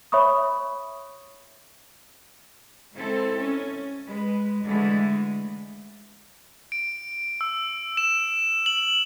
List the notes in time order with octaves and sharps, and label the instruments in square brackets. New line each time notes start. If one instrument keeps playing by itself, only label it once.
[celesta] C#5 E5 B5 C#6 D#6
[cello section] G#3 C4 E4 A4
C#4
G#3 B4
D3 E3 G#3 A3
[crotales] D7
E6
E7
F#7